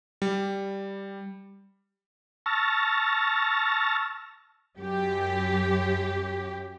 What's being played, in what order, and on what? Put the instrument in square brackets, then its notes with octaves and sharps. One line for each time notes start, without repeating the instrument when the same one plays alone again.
[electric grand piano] G3
[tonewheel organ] A5 C#6 E6 F6 A6 A#6
[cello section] F#2 G4